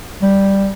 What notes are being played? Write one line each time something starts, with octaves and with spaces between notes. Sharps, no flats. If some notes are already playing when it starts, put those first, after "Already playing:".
G3